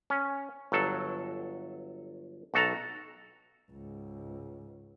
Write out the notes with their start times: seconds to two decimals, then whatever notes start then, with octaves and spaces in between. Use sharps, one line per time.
0.10 C#4
0.72 G1 F#3 A4
2.54 B1 F#4 A4 A5 A#5
3.71 C#2 G#2